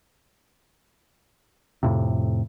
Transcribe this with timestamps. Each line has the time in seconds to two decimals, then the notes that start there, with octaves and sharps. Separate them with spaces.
1.83 F2 A2 C3